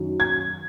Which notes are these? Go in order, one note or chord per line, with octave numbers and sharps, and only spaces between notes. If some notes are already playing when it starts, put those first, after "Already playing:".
Already playing: F#2 D#3 F#3
G#6